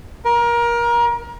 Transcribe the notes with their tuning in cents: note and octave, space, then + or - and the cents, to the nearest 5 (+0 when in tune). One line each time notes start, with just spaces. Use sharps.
A#4 +25